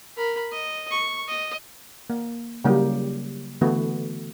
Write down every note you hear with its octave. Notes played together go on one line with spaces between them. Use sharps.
A#4 B5
D#5
C#6
D#5
A#3
C#3 F#3 G3 A#3 E4 G4
D3 E3 A3 B3 F#4